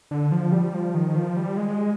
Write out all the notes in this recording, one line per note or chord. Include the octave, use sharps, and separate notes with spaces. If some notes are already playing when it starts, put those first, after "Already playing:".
D3
F3
G3
F3
D#3
F3
G3
G#3